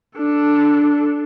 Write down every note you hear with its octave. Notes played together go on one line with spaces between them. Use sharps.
D4 A4